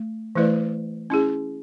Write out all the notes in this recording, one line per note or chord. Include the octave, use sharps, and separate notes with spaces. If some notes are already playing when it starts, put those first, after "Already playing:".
Already playing: A3
E3 A3 E4 B4 D5
C#4 E4 G#4